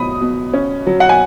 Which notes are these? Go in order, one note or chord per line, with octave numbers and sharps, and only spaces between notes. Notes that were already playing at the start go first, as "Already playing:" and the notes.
Already playing: B2 F#3 B5 D#6
B2
C#4
F#3
F#5
G#5